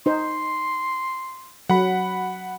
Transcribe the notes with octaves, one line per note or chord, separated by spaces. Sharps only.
D#4 C5 C6
F#3 F#5 B5